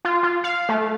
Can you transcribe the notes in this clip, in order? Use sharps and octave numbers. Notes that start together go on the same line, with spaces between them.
F4
F4
F5
A3